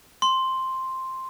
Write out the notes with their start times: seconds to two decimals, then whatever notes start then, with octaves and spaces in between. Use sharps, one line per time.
0.22 C6